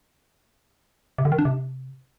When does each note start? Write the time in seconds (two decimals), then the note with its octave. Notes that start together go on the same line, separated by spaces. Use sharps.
1.18 C3
1.25 D3
1.32 D#3
1.39 D4
1.45 C3